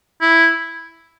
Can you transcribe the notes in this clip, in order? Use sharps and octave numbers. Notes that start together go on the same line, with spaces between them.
E4